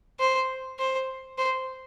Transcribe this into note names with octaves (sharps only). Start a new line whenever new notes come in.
C5
C5
C5